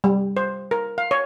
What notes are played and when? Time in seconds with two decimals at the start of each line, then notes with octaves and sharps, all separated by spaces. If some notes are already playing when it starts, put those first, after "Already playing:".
0.04 G3
0.37 C5
0.71 A#4
0.98 F5
1.11 C#5